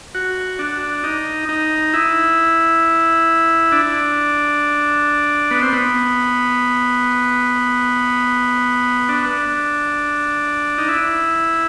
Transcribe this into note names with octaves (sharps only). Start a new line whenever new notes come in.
F#4
D4
D#4
D#4
E4
D4
B3
C4
B3
D4
D#4
E4